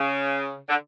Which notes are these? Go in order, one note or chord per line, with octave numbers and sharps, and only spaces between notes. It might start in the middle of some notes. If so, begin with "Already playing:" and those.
Already playing: C#3
D3